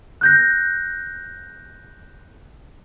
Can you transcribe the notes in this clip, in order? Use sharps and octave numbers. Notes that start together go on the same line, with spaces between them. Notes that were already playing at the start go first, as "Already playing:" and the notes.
F#6 G6 A#6